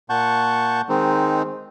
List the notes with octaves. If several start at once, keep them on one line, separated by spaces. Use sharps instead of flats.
A#2 F#5 A5 C#6 G6
D#3 G#3 C4 D#4